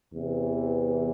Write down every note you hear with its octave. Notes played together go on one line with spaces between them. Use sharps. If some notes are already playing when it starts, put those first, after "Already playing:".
E2 C3 E3